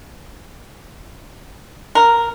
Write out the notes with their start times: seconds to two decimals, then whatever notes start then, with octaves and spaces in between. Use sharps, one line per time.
1.95 A#4